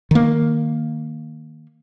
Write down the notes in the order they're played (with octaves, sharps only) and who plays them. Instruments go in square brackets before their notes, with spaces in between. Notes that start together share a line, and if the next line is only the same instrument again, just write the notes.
[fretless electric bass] D#3 A#3